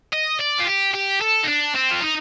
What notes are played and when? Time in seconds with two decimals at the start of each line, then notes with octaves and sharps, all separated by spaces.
0.13 D#5
0.39 D5
0.59 F4
0.66 G4
0.94 G4
1.21 A4
1.43 D#4
1.48 D4
1.75 C4
1.91 F4
2.01 D#4